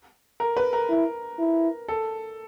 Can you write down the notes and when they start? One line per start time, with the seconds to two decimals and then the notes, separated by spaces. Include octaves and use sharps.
0.40 A#4
0.57 B4
0.73 A#4
0.89 E4
1.39 E4
1.88 A4